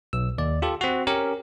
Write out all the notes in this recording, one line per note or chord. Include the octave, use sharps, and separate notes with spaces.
B1 E6
D#2 D5
F4 G4 A4
C4 F#4
C#4 G4 A#4